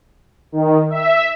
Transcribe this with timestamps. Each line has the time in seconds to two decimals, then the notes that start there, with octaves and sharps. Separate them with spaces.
0.52 D#3
0.90 E5